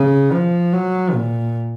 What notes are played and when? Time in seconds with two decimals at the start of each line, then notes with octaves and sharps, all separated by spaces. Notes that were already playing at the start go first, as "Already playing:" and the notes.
Already playing: C#3
0.32 F3
0.73 F#3
1.14 A#2